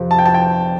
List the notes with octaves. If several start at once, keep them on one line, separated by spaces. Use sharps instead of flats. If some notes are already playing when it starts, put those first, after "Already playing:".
Already playing: F2 C3 F3
A5
G5
A5
G5